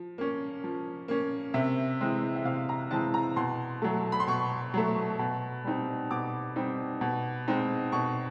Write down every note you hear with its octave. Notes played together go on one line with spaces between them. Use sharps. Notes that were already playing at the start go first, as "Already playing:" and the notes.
Already playing: F3
A#3 C#4
F3
A#3 C#4
C3 E5
E3 G#3 C4
E5
C3 F5
A#5
E3 G#3 C4 A5
A#5
B2 C6
F#3 A3
B5
C6
B2 C#6
F#3 A3
B2
G3 C4 D#4
B2 D6
G3 C4 D#4
B2
G#3 C4 D#4
B2 C#6